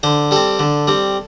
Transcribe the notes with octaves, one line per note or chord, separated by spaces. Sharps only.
D3 C5
G3 C4 A4
D3
G3 C4